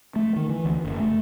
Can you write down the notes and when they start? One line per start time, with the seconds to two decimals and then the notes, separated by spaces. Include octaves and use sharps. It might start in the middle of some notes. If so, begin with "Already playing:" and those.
0.16 A3
0.36 D#3
0.49 E3
0.65 D2
0.84 F#1
1.00 A3